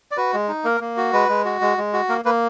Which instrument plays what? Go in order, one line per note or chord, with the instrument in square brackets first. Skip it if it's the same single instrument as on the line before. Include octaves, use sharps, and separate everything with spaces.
[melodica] D5
F#4 B4
G#3
D#4
A#3 A#4
A#3
F#4
G#3 B4
G#3
F#4
G#3
G#3
F#4
A#3 A#4
A#3 B4